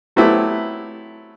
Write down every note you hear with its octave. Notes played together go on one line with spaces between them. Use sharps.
F#3 A3 B3 C4 E4 G4